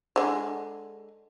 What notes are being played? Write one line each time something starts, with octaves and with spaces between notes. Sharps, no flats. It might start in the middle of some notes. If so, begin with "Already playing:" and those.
D3 G#3